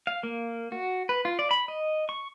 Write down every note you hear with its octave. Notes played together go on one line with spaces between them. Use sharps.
F5
A#3
F#4
B4
F4
D5
B5
D#5
C#6